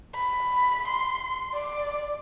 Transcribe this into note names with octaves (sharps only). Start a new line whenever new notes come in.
B5
C6
D5